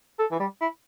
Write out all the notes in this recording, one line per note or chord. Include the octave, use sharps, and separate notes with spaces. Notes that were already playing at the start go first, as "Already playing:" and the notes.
A4
E3
G3
E4